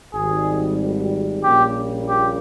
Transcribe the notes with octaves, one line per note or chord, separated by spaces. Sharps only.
G#1 G#2 G3 G#4
A#1 A#2 G3 A#3 C#4 G4
G4